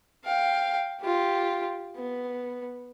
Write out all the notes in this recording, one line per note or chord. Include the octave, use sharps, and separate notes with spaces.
F5 G5
F4 G4
B3